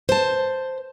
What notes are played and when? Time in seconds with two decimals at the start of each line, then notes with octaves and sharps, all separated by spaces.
0.09 C5 A5